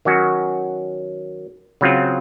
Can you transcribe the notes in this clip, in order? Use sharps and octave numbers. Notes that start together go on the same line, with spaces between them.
D#3 F#3 C#4 F#4
C#3 F#3 C4 F4